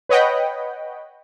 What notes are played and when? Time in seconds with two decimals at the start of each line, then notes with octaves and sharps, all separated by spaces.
0.09 B4 C#5 D#5 F#5 G5 B5